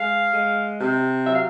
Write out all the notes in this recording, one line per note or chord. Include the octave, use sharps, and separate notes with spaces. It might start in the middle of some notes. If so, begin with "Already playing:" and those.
Already playing: G#3 F5
G#3
C3
F#3 E5
F5